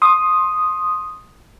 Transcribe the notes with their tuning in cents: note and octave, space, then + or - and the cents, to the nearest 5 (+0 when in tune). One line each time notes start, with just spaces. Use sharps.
C6 +20 D#6 +0